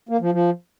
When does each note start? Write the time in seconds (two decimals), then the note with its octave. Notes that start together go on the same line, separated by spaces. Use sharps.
0.09 A#3
0.21 F3
0.32 F3